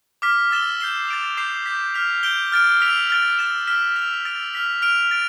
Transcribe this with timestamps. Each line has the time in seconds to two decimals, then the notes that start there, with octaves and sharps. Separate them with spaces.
0.22 D6 F6 B6
0.51 E6 A6 E7 G7
0.80 G6 C7 E7 G7
1.08 A6 D7 F7
1.37 D6 G6 C7 E7
1.66 D6 G6 B6
1.94 F6 B6 F7
2.23 G6 D7 G7
2.52 F6 A6 D7
2.81 E6 B6 D7 F7
3.10 F6 A6 D7
3.39 E6 A6 E7
3.67 F6 B6 E7 G7
3.96 E6 B6 F7
4.25 E6 A6 D7 F7
4.53 F6 B6 F7
4.82 F6 B6 D7 F7
5.11 A6 D7